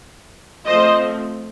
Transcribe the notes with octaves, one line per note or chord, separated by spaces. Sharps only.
F3 A3 C4 C5 D#5